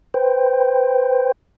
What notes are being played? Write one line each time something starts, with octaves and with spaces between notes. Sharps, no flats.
B4 C5 G5